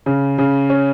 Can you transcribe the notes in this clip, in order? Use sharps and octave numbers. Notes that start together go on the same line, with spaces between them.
C#3
C#3
C#4